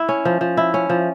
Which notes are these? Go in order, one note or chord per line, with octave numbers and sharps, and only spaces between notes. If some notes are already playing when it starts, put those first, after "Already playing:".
Already playing: E4
C#4
F3
F3
E4
C#4
F3